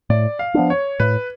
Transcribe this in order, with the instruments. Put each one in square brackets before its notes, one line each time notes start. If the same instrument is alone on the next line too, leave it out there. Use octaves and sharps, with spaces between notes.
[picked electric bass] A2 [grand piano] D5
[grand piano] F5
[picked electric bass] F3 B3 D4
[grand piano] C#5
[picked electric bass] A2 [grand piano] B4